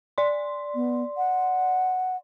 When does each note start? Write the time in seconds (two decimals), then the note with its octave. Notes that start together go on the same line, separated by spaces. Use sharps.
0.18 D5 C6
0.75 B3
1.17 F#5